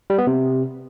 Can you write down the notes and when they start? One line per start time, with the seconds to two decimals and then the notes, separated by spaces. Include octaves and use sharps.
0.10 G3
0.18 B3
0.27 C3